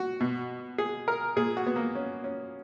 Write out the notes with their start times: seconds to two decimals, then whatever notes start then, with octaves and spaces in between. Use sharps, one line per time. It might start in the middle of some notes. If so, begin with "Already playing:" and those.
Already playing: F#4
0.20 B2
0.78 G#4
1.08 A#4
1.36 A#2 G#4
1.57 F#4
1.66 B3
1.76 A#3
1.95 C#4
2.24 C#4